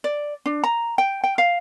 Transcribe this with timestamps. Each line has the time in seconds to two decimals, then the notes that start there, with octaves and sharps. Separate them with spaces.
0.04 D5
0.46 D4
0.64 A#5
0.98 G5
1.24 G5
1.38 F5